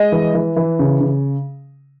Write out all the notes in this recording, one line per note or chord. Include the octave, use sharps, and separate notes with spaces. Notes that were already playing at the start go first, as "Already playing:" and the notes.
Already playing: G#3 D#5
E3
E3
E3
C#3
C#3